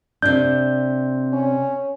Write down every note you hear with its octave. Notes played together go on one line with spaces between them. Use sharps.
C3 D4 G6
C#4